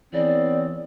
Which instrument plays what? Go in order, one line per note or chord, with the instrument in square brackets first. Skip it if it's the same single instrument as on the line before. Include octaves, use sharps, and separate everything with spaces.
[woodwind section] C#3 B3 C4 [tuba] E3 [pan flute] D5